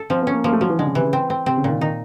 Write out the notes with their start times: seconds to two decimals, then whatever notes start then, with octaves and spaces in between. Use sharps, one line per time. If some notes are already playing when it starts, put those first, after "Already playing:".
Already playing: A4
0.10 F3 C4
0.22 B3
0.27 C#4
0.33 A#3
0.44 F3 A#3
0.53 A3
0.61 F3 F#3
0.70 E3
0.79 D3 G#3
0.87 C#3
0.95 C3 E3
1.05 C#3
1.13 C4
1.30 C4
1.46 C3 C4
1.57 C#3
1.64 A#2
1.69 D#3
1.81 D#3 D#4